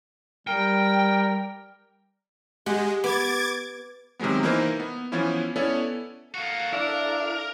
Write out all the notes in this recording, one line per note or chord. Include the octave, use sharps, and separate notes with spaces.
G3 A#4 G5
G#3 G4 F#5
B3 D6 G#6 A6
C3 D#3 F#3 G#3 B3
E3 A#3 D#4 E4 A#4 C5
B3
E3 F3 B3 C#4 E4
B3 C#4 E4 A4 C#5 D5
A#3 F#4 A4 F5
D4 E4 A#4